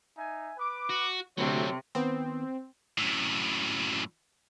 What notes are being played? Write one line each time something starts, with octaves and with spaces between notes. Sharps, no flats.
D#4 E5 G#5
B4 D6
F#4
D2 C3 F#3 C4 A4 C#5
D#3 B3 C4
F#2 A2